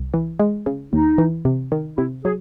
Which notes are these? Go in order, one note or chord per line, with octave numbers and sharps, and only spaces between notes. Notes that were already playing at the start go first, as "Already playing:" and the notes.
Already playing: C2
E3
G#3
C#3
D#2 D#4
E3
C3
D#3
C3 E4
F#3 G#4